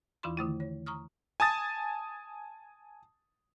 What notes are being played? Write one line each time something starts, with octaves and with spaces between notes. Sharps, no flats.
E2 E3 E4 F4 B5 C6
D3 D#3 A3 E4
C#5
A#5 C#6 D#6 F6
G#5 A5 D#6 A6